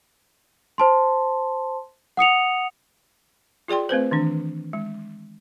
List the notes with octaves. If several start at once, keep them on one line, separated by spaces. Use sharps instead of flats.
C5 A5 C6
F#5 D#6 C#7 F7
F4 G#4 D5 G5 C6
A3 C4 B4 C5
D#3 E3 D4
G#3